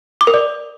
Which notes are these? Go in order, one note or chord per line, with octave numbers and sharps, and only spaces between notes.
D6
A#4
D5